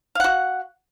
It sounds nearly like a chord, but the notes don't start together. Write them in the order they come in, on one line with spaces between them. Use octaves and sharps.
F5 F#5 F#4